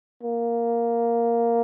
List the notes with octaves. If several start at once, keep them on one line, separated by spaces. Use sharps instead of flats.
A#3